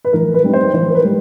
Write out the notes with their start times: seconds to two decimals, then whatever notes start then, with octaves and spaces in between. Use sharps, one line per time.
0.05 B4
0.13 E3 A#4
0.34 B4
0.44 G3 C4 D#4
0.53 C5
0.74 E3 C5
0.89 A#4
0.95 B4
1.05 G3